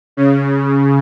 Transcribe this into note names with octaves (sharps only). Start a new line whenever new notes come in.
C#3